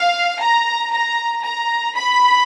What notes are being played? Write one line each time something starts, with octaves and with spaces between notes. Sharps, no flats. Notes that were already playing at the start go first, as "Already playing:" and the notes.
Already playing: F5
A#5
A#5
A#5
B5